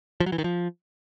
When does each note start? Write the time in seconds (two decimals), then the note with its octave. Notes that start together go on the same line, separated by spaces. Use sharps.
0.20 F3
0.26 F#3
0.32 E3
0.38 D#3
0.44 F3